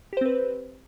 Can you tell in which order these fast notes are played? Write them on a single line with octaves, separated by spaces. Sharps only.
G4 C5 C4 B4